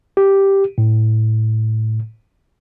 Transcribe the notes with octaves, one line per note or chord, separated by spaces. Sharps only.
G4
A2